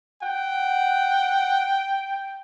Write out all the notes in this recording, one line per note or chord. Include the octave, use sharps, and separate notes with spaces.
F#5 G5